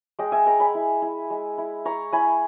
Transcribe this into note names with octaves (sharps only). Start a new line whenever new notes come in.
G#3 D#5 G5
E5 G#5
G#3 G5 A#5
G#5 B5
E4
E4
G#3
E4
E4 A#5 C#6
E4 G#5 B5